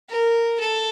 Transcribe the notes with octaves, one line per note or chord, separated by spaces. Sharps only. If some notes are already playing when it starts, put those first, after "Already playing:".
A#4
A4